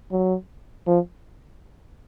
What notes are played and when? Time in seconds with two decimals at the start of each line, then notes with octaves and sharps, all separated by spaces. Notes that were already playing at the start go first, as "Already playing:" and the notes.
0.12 F#3
0.87 F3